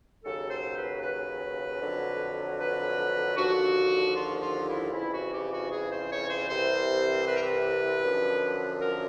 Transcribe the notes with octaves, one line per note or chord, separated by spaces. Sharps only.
D#2 C#3 F#3 A4
C5
B4
B4
F2 D3 F#3
B4
D#2 D3 F3 F#4
F4
F4
E4
F2 C#3 E3 E4
F#4
G4
F#4
G#4
C5
C#5
C5
C2 C3 E3 C5
B4
A#4
B4
F#2 D3 F3
A#4